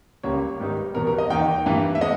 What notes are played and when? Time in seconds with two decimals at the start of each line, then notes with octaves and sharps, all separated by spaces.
0.23 C#2 C#3 G3 A#3 C#5
0.59 G#2 D#3 G3 B3 D#4
0.94 E2 B2 G3 B3 A#4
1.07 A#4
1.18 D#5
1.30 E2 D#3 A#3 D#4 G5
1.66 G2 E3 A#3
1.95 E5
2.01 G#3 B3 D#5